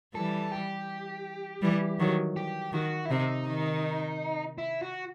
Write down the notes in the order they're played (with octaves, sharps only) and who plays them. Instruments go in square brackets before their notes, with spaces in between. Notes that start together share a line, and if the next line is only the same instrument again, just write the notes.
[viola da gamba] E3 G3 [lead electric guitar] A4
[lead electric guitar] G4
[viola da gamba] E3 G3
D#3 F#3
[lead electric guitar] G4
[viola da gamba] D#3 [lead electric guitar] F#4
[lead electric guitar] E4
[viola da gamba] C3 [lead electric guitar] D#4
[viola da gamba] D#3
[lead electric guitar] E4
F#4